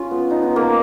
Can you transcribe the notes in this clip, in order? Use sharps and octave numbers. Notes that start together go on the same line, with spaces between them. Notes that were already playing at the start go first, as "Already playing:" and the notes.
Already playing: C#4 F4
B3
D#4
B3
A#3